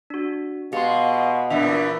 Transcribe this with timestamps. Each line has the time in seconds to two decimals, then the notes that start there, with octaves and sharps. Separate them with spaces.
0.10 D4 F#4
0.73 B2 G#3 G4 F5 C6
1.50 E2 A#2 E3 D4 E5